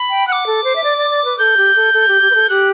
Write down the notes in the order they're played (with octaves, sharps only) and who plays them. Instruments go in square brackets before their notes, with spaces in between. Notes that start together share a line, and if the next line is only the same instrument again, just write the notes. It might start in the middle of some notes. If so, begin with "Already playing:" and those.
Already playing: [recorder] B5
[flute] G5
[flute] F#5 [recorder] D6 F#6
[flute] A4
C5
E5
D5
D5
D5
B4
[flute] A4 [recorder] G6
[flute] G4
A4
A4
G4
G4
B4
A4
[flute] G4 [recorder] F#6